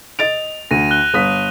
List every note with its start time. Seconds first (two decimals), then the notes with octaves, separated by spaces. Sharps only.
0.19 D#5 A6 D7 F7
0.71 D2 A#6 D#7
0.91 F#6 G7
1.14 G1 D#6 B6